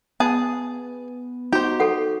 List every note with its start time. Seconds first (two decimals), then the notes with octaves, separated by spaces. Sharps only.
0.20 B3 G#4 A5
1.53 D#4 F#4 G4 C5
1.80 A4 F#5